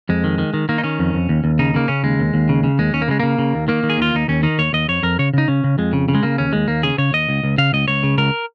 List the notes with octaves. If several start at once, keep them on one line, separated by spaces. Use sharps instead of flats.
F2 G#3
D#3
D#3
D#3
D#3 A#3
D#4
D#3 C#4
F2
F2
D#2
D#2
C#3 D#4
C#3 A#3
C#3 C#4
D#2 G#3
D#2
D#2
C#3
C#3
D#2 G#3
D#2 C#4
A#3
C#3 G#3
C#3 A#3
C#3
D#2
D#3 A#3
D#3
G#4
D#2 F4
D#2 D#4
D#2 C#4
D#3 D#4
D#2 C#5
D#2 D#5
F2 C#5
F2 A#4
C#3 C#5
C#3 D#4
C#3 C#4
C#3
F2 G#3
C#3
C#3
G#3
C#3 A#3
D#2 C#4
D#2 G#3
D#2 A#3
C#3 G#4
C#3 C#5
D#2 D#5
C#2
C#2
C#3 F5
C#2 D#5
C#2 C#5
C#3
C#2 A#4